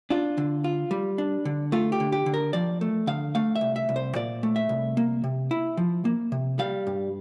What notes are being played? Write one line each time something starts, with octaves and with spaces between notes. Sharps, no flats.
D4 F4
D3
F4
G3
D4
D3
A3 F4
G4
D3
G4
D3
A#4
F3 D5
A3
D3 F5
A3 F5
E5
C2
E5
C2
C5
A#2 D5
A3
E5
C2
A#3
C3
E4
F3
A#3
C3
G3 F5
G2